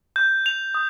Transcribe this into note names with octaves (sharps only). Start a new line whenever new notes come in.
G6
F7
D#6